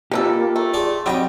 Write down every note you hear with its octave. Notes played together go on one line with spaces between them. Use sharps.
B2 A#3 D#4 F4 G4 A4
A3 A4
G#4 A4 D5 C6
F#3 G3 C4 G4 D#5 G5